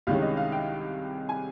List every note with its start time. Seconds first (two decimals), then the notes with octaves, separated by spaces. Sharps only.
0.07 C2 C3 D#3 G#3 C#4 F5
0.22 D#5
0.37 F5
0.52 G5
1.29 G#5